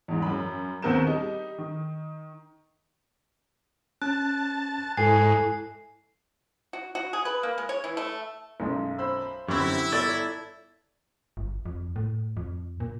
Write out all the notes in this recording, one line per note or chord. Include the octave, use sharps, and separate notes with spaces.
E2 G#2
F#2 B5
D#2 B3 C4 A#4 G6 E7
G3 D#4
D#3
C#4 A5 F#6
G#2 E4 A4 G#5 C7
F#4
F#4
G#4
B4
A#3
G#3
C#5
E3
A3
B1 F#2 G#3
C5 B5 E6
F#2 D3 C4 E4 G4 B5 C#6
G1 A4 C#5 D5 A6
G1
F2
A2
F2
A#2